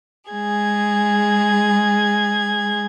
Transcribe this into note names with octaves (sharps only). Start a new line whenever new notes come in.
G#3 G#4 G#6